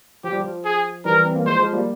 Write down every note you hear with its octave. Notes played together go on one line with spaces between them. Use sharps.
F3 G4
G3
F3
G#4
E3 G3 A#4
C4
A#3
F3 G#3 C5
F3 G#3
G3 A#3